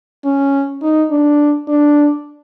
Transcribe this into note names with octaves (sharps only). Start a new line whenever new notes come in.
C#4
D#4
D4
D4